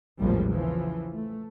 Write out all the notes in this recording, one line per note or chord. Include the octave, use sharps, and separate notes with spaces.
A#1 E2 A2 F3 G3 G#3
C#3 E3 F3
A3